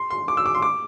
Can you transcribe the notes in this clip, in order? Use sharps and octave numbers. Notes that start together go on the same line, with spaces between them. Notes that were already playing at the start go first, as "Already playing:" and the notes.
Already playing: C6
C6
D6
E6
D6
C6
D6